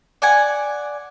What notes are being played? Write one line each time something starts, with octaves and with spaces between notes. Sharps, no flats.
D5 F#5 G#5